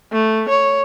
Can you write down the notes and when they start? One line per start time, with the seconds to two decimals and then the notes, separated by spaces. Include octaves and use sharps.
0.12 A3
0.49 C#5